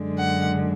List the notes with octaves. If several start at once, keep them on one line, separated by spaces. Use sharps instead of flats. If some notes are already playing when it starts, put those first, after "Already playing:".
Already playing: F#2 D3 G#3
F#5